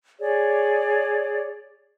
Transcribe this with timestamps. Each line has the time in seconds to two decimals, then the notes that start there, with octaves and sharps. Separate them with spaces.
0.20 G#4 C#5 D5